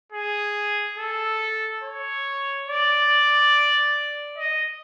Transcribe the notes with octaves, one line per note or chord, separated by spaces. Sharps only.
G#4
A4
C#5
D5
D#5